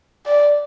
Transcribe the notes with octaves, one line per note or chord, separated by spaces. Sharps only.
D5